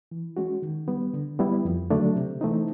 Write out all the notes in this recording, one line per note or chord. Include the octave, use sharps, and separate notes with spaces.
E3
G#3 C#4 F#4
D#3
G3 B3
D3
G3 B3 E4
F2
D3 F#3 A3 D4
C3
E3 A3 C4 D#4